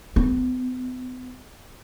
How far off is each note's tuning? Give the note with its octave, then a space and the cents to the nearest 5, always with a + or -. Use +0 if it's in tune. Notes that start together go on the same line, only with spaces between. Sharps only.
B3 +45